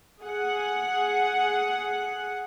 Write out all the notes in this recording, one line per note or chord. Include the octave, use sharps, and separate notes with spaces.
G#4 F#5